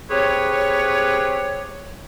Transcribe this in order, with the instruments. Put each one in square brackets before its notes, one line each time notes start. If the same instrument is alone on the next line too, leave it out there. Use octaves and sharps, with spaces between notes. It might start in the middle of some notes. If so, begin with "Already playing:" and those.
[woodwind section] C4 G4 G#4 B4 C#5